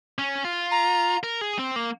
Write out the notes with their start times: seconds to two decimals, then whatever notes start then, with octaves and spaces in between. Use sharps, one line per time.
0.19 C#4
0.44 F4
0.71 A#5
1.23 A#4
1.41 G#4
1.59 C4
1.76 A#3